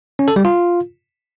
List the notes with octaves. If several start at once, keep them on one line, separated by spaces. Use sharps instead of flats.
C#4
A4
G3
F4